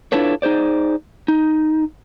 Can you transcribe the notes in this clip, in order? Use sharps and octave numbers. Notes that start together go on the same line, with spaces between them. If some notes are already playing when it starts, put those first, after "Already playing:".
D4 E4 F4 A4 B4 C#5
D#4 G#4 C5 D5
D#4